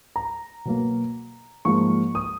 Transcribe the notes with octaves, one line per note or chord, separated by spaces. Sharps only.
A#5
B2 F#3 A#3
G#2 F3 A#3 C#6
D#6